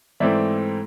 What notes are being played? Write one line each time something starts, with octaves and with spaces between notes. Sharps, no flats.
G#2 E3 A3 C4 D5 E5